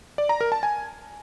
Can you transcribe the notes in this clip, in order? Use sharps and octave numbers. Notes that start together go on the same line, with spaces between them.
D5
A#5
A#4
A5
G#5